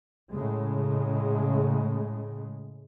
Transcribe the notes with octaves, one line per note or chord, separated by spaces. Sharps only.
A2 C#3 G#3